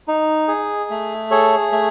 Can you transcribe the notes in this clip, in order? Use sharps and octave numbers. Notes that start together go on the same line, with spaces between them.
D#4
G#4
A3
G#4 A4 C#5
A3